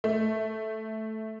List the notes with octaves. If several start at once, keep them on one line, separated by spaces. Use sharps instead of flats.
A3